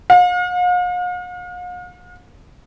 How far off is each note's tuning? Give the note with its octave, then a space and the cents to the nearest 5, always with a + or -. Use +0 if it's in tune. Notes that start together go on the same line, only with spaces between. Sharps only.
F5 +45